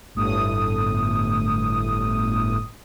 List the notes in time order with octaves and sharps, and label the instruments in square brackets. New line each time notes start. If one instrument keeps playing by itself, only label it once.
[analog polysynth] G1 A2 D#6